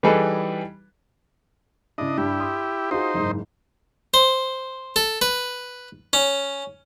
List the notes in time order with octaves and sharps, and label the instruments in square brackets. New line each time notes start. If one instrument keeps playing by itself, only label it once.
[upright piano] E3 G3 D#4 G#4 A4 B4
[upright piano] C#3 E4 [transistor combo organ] D4 D#5
[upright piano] G2 [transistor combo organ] E4 G4
[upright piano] C6 D#6
[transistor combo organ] D#4 C5 [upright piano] F4 F#4 G#4
[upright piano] F#1 G#2
[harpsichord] C5
A4
B4
C#4